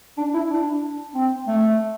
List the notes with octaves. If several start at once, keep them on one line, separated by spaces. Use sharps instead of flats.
D4
E4
D4
C4
A3